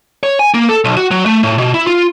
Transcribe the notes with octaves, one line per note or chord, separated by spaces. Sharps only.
C#5
G#5
A#3
A4
B1
F#4
F#3
A3
A2
B2
E4
F4